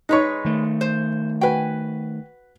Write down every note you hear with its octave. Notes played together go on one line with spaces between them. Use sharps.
G#3 D#4 B4 C#5 C#6
D#3 A3
C5
F#4 B4 G5 G#5